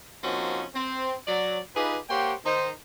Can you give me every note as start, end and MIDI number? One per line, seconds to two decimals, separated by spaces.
0.23 0.64 53
0.23 0.64 58
0.23 0.64 60
0.23 0.64 61
0.23 0.64 63
0.23 0.64 66
0.74 1.15 60
1.27 1.59 54
1.27 1.59 74
1.76 1.98 63
1.76 1.98 65
1.76 1.98 67
1.76 1.98 68
1.76 1.98 71
2.10 2.33 58
2.10 2.33 67
2.10 2.33 72
2.10 2.33 73
2.10 2.33 78
2.10 2.33 79
2.45 2.70 51
2.45 2.70 63
2.45 2.70 72